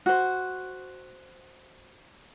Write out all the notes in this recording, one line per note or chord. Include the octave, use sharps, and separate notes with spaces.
F#4 C5